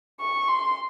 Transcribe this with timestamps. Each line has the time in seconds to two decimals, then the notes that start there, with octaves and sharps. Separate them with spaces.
0.20 C#6
0.48 C6